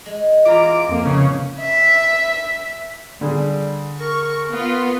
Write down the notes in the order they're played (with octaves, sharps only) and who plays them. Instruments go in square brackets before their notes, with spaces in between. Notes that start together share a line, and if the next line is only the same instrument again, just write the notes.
[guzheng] G#3
[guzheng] E3 B3 [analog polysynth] F4 A#5 [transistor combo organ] D6
[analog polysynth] F2 A#3
[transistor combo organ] C#3
[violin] E5
[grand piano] D3 G#4 [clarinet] G3
[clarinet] A#4 [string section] C#6
[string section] B3 F4